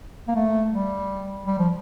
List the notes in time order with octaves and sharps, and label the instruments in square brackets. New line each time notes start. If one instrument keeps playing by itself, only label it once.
[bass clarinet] A#3
A3
G3
G3
F3